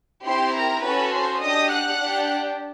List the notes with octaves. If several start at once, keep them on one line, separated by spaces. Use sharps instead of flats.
C4 E4 G4 C5 C6
A#4 A#5
C#4 F#4 A4 B4 B5
C5 C6
D4 G4 D#5 D#6
F#5 F#6
D4 G4